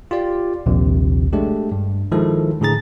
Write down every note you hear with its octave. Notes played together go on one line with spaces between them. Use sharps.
F4 G4 D5
A#1 D#2 C3
G#3 A3 D4 G4
G2
D#3 F3 G#3 E4 A4
A2 D3 G#4 A#5 A6